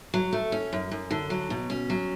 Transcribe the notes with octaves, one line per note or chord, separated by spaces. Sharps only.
F#3
A3
C#4
F#2
F#2
D3
F#3
B2
C#4
F#3